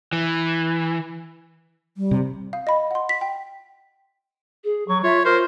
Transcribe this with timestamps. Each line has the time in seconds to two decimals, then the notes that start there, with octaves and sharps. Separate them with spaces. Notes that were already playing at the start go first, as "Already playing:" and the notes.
0.13 E3
1.97 G3
2.11 C3
2.53 F5
2.67 D#5 B5
2.91 F#5 C6
3.09 B6
3.21 G5
4.64 G#4
4.88 F#3 C#6
5.04 F4 C#5 E5
5.25 F4 A#4 C5